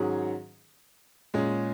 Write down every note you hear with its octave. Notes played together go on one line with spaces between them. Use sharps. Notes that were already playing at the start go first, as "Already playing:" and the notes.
Already playing: G#2 D#3 F#3 C#4 G#4
A#2 G#3 C#4 G#4